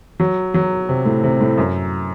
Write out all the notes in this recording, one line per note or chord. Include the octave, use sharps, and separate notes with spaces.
F#3
F#3
C3
A2
C3
A2
F#2